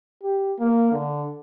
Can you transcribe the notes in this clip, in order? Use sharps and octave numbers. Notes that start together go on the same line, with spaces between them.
G4
A#3
D3